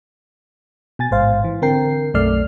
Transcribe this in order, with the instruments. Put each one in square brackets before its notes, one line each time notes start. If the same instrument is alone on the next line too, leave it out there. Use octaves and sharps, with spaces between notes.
[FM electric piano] B2 G#5 A6
A1 G#2 C5 F5
E3
D3 C4 A#4 G5 C7
B1 F#2 A3 D5 F6 C7